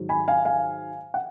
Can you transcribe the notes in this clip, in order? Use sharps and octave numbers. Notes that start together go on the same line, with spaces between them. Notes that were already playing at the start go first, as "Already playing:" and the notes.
Already playing: G#2 D#3 F#3
G#5 B5
F5 G#5
F5 G#5
F#5